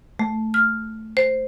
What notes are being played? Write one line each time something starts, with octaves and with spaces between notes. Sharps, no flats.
A3
F6
C5